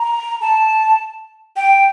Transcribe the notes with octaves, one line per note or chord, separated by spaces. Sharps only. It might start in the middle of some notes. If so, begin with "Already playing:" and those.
Already playing: A#5
A5
G5